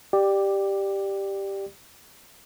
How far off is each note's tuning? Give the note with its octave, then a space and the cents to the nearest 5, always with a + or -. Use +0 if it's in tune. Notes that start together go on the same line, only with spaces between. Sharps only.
G4 +0 D5 +15